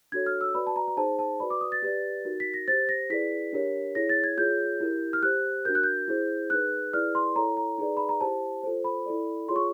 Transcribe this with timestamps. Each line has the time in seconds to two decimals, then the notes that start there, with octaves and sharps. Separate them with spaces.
0.12 D4 F#4 A4 C#5 G#6
0.26 F6
0.41 E6
0.55 F#4 B4 D5 B5
0.67 A5
0.76 A#5
0.87 A#5
0.97 D#4 G#4 C5 A5
1.19 A5
1.40 F#4 B4 D5 B5
1.50 D6
1.61 D#6
1.72 A6
1.82 G4 B4 D5
2.25 D#4 F#4 A#4
2.40 B6
2.54 A#6
2.68 G4 C5 A6
2.89 A#6
3.10 E4 G#4 B4 D5 B6
3.53 D4 G4 A#4 C#5
3.95 E4 G#4 C#5 A#6
4.09 A6
4.24 G#6
4.37 F4 G#4 C#5 G6
4.80 E4 G4 A#4
5.13 F6
5.23 G4 C5 F#6
5.65 D4 F#4 A#4 G6
5.75 F#6
5.84 G6
6.08 E4 G#4 C5
6.50 D#4 G#4 B4 F#6
6.93 E4 G#4 B4 D5 F6
7.15 C6
7.36 E4 A4 C#5 A#5
7.57 A#5
7.78 D#4 G#4 B4 D5
7.97 B5
8.09 A#5
8.21 E4 G4 C5 A5
8.63 F4 A4 C5
8.84 B5
9.06 E4 A4 D5
9.49 F4 G#4 C#5 C6
9.56 C#6